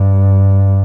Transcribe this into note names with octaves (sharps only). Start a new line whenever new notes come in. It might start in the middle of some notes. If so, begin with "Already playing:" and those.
Already playing: G2